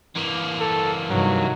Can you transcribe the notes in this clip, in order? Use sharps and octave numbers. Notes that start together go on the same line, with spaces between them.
E3 A#3
A4
G2 C3 D#3 F#3